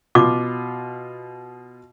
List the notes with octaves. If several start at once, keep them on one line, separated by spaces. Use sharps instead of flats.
B2 F4 D6